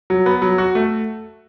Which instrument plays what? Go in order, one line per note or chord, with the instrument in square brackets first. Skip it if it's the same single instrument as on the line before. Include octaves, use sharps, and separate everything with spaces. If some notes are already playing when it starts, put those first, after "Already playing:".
[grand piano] F#3
B3
F#3
F#4
A3